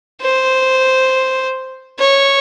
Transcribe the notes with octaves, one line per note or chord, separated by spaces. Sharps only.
C5
C#5